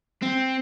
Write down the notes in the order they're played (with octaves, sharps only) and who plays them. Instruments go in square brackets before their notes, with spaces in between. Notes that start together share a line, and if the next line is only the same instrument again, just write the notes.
[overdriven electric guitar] C4